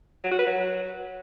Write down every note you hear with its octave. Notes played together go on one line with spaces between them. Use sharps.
F#3
F#4
B4
F#3